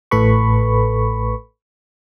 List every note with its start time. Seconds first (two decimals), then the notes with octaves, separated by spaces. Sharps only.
0.11 A1 A2 A4 B4 B5 C#6